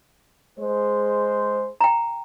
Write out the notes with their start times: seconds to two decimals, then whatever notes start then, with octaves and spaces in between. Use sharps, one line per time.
0.58 G#3 C5
1.81 G5 A#5